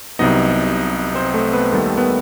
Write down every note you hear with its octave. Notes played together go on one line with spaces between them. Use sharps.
C2 C3 F#3 B3 D#4 D#5
C4 C5
A3 A4
B3 B4
D#2 D#3 G3 A3 B3 A4
A4
B3 B4